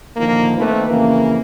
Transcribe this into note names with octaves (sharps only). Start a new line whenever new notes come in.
A#2 D3 D#3 F3 A#3
D#3 A3 A#3 C4 B4
F2 C#3 E3 A#3